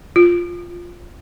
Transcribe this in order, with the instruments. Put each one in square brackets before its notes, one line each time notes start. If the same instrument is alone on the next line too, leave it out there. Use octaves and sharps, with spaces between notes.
[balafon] F4